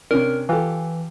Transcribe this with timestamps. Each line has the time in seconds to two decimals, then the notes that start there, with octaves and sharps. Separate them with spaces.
0.11 C3 C#4 D4 A#4
0.49 E3 F4 G4 A4